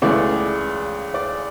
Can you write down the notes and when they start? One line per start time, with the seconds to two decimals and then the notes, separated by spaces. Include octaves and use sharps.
0.02 C#2 C#3 E3 A3 D5
1.14 D5